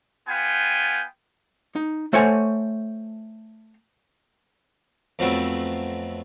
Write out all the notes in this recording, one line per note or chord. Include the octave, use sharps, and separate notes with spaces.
B3 F4 G5 G#5
D#4
A3 C5 C#5 F#5 G#5
F2 F3 F#3 A3 B3 C4